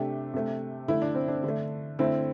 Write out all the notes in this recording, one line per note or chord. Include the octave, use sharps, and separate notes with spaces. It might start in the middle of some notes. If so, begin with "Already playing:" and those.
Already playing: C3 A3 D4 G4
C3 A3
D3 A3 E4
D4
C4
D4
D3 A3
D3 A3 C4 E4